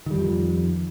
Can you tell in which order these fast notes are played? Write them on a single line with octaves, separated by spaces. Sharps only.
D#3 G3 F2 F3